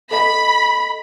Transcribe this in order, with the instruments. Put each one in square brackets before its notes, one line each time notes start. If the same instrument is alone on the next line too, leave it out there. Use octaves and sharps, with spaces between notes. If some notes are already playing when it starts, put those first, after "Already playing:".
[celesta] A4 D#5 [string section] B5